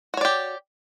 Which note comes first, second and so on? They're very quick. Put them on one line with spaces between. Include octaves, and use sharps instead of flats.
F#4 C#5 D5 G4